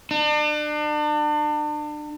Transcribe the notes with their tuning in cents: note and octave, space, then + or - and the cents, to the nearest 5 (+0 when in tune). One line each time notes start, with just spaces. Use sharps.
D4 +35